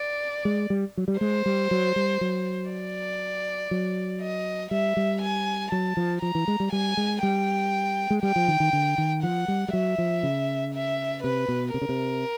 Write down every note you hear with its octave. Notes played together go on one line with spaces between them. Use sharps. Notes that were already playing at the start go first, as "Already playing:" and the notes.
Already playing: D5
G#3
G3
F#3
G3
G#3 C5
G3
F#3
G3
F#3
D5
F#3
D#5
G3 E5
G3
G#5
F#3 A5
F3
F3 A#5
E3
G#3
G3
G3 G#5
G#3
G3 G5
G#3
G3 G5
F3
D#3
D#3
D3
D#3
F3 F#5
G3
G3
F#3 E5
F3
C#3
E5
C3 B4
B2
C3 A#4
C#3
C3